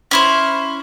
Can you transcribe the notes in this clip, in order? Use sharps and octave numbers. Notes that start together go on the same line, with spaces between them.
C#4 E4 C5